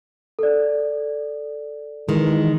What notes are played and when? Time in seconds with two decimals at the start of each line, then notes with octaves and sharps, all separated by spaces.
0.39 A4 D5
2.09 D#3 E3 G#3